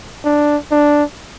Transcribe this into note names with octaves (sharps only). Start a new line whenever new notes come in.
D4
D4